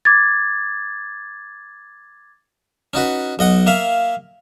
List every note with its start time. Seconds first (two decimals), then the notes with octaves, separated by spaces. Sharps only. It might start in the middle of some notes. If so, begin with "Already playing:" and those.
0.05 D6 G#6 A6
2.93 C#4 D#4 F#4 B4
3.39 B1 D#5 F#5 D#6
3.66 A#3 E5 F5